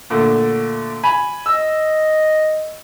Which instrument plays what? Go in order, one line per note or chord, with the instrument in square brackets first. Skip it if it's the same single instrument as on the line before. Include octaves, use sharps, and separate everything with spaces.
[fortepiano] A#2 D3 A3
G#5 B5
[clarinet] D#5 [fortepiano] E6